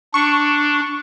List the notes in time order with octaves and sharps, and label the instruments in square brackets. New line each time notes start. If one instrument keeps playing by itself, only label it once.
[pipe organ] D4 [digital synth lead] C#6